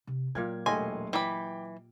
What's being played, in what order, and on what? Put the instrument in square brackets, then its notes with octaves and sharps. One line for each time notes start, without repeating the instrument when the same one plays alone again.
[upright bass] C3
[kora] A#2 F5 G5 [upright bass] F#3 [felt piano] G#6
[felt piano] E1 A3 C6 [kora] G4 D#5 F5 [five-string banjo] G#5
[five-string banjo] E3 B5 [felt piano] G5 D6